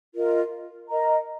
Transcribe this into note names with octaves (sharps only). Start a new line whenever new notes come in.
F4 A#4 D#5
A#4 D#5 A#5